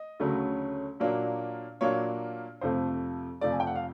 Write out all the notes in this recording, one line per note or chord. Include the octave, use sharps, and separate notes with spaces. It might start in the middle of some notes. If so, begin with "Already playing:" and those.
Already playing: D#5
D2 C#3 F#3 A3
A#2 F#3 A#3 D4
A#2 F#3 A#3 D4 C#5
F2 C3 F3 A3 C5
F2 C3 F3 A3 D5
G#5
G5
F#5
F5